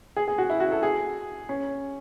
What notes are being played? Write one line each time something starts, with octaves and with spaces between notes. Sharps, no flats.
G#4
G#4
F#4
E4
F#4
A4
G#4
C#4